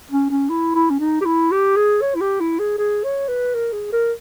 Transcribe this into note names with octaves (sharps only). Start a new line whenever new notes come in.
C#4
C#4
E4
E4
C#4
D#4
G4
E4
G4
G#4
C#5
E4
G4
E4
G#4
G#4
C#5
B4
A#4
G#4
A#4